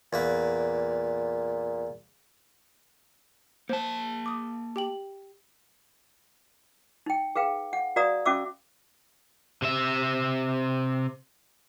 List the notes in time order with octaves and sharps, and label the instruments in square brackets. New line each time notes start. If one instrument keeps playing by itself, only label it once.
[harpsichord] E2 A#3 B4 [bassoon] A#2
[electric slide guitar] A#3 A5 [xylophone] C5
[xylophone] D6 D#6
G4 G5 F#7
[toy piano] D#4 G5
G#4 B4 F5 G5
F#5
F#4 B4 D5 F5 A#5 D#6
C#4 F#4 E5 D6 E6
[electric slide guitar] C3 E5